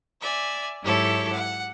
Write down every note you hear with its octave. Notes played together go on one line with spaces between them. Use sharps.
D5 E5 G#5
G#2 F#3 E4 G4 A4 C#5
F#5